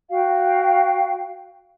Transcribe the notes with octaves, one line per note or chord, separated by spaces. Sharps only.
F#4 F5 G5